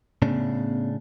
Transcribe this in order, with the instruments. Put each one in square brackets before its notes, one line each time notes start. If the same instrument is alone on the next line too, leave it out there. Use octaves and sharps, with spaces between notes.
[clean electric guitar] A2 C#3 D4 [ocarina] B3